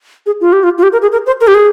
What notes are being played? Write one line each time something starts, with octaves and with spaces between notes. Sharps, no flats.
G#4
F4
G4
F4
F4
G4
A#4
G#4
A#4
C5
A#4
G4
G#4